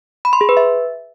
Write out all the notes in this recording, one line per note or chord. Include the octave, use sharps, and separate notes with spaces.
B5
C6
G#4
B4
E5